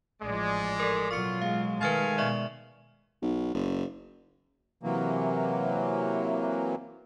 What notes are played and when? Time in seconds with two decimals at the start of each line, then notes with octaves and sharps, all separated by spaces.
0.22 A1 F3 G#3 D5
0.80 A4 A#4
1.11 B2 F#3 F4 C#6 C#7
1.42 G#3 F5
1.81 D#3 A3 B4 F5 G#5 F6 A6
2.18 B2 D5 E5 C#6
3.22 B1
3.54 F#1
4.83 C3 E3 F#3 A#3